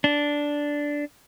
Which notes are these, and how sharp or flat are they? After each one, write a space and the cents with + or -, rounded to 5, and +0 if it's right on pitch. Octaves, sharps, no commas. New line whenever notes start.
D4 -5